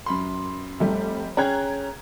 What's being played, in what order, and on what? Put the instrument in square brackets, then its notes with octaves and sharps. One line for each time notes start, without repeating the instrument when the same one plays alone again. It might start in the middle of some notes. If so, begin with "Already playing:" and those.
[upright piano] F#2 B5 C6
[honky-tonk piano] F1 G3 [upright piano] A3
[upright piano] C#4 G#4 G5 [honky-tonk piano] A#5 F#6 G#6